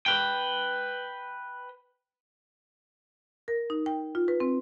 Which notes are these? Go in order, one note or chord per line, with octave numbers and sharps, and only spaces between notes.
B4 G5
A#4
D#4
G5
F4
B4
C4